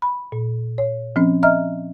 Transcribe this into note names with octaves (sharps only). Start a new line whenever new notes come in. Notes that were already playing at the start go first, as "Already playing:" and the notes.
B5
A#2
C#5
F3 C4 C#4
D#5 E5 A#5 F6